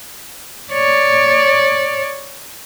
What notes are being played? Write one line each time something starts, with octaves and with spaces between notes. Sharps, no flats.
C#5 D5